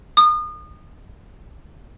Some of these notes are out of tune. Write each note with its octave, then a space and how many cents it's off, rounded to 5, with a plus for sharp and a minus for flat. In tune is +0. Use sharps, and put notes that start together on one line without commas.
D#6 -35